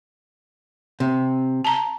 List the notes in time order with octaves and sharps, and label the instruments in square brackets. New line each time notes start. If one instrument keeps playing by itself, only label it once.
[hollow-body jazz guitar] C3
[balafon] A5 A#5